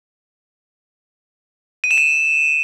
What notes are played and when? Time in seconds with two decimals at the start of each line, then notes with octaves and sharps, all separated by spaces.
1.84 D#7
1.91 E7
1.98 D#7